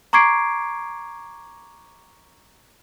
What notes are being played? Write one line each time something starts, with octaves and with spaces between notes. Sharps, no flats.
A#5 C#6 D6 G#6 C7 D7